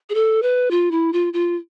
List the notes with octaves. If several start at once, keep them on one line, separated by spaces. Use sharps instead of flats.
G#4
A4
B4
F4
E4
F4
F4